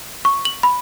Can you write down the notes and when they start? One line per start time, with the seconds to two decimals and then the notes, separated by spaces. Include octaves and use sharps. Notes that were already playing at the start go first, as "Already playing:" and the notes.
0.25 C#6
0.45 F#7
0.63 B5